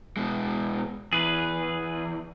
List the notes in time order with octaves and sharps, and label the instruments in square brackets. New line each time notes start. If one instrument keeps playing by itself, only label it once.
[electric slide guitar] B2 G#3
[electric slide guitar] E2 [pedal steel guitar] G#4 B4